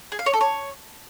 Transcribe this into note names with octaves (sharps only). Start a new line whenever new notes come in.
G#4
F5
C#5
A4
C#5